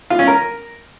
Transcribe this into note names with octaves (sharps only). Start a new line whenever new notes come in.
F4
C#4
A#4